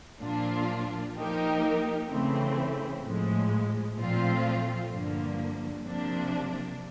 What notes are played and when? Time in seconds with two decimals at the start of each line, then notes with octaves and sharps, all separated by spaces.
0.21 A#2 F3 A#3 D4 F4
1.16 F3 A#3 D#4 G4 A#4
2.09 C#3 E3 A3 C4
3.04 A2 F3 G#3
3.98 A#2 F3 A3 C4 F4
4.92 G2 D3 F3 A#3
5.86 C3 F3 A#3 D4